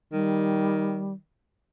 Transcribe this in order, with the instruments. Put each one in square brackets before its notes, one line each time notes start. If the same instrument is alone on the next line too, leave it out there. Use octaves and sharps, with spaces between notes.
[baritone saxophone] D#3 [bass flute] G3